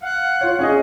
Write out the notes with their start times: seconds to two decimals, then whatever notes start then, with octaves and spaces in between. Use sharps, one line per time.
0.02 F5 F#5
0.41 F4 C#5
0.59 C#4 G#4 D#5